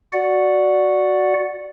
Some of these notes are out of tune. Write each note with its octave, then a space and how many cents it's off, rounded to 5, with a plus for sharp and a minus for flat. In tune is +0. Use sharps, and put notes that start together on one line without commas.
F#4 +0 D5 +0 F#5 -10